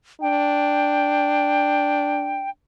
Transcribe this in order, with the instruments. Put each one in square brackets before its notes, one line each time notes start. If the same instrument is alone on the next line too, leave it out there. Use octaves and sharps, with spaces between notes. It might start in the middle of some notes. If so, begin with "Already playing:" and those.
[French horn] D4 [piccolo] G5